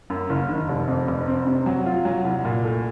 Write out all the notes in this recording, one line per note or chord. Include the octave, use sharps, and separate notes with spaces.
F#2
F#1
D#3
F1
F2
F1
C4
C3
F#3
F4
F#3
C2
A#2
A3